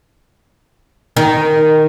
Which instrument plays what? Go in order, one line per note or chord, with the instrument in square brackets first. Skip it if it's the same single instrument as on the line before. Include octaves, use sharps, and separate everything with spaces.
[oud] D#3